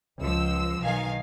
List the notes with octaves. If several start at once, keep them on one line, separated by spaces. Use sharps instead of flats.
C#2 F3 E6
B1 D#3 F5 G#5